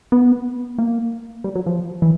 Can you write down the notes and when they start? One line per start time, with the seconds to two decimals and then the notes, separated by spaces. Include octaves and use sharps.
0.12 B3
0.78 A#3
1.44 G3
1.56 F#3
1.66 F3
2.02 E3